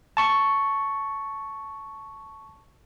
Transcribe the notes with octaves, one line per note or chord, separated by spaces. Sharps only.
A5 C#6